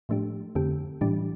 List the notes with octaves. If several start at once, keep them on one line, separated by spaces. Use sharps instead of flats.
A2 F3 A3 D4 G4
F2 D3 A3 C4 G4
A2 E3 G3 D4 G4